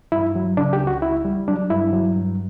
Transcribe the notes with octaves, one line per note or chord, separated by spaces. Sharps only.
G2 E4
F#3
C#3 D4
G4
C#2
F#4
C#2 E4
G3
F#3 D4
G2 E4
F#3
G2